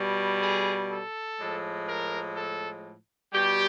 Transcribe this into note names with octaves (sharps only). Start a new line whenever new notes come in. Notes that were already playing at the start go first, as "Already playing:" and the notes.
Already playing: B2 G3
G#4
A4
A2 F3 G#3
A#4
A4
B2 G3 G4